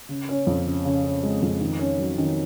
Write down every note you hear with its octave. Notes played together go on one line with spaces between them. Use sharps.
C#3
C#4
F2
C#3
C#3
C#4
G#3
F2
D#3
C#4
F#3
D#3